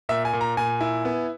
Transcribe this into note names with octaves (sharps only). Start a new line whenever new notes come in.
A#2 E5
G#5
A#2
A#5
A#2 G#5
E4
B3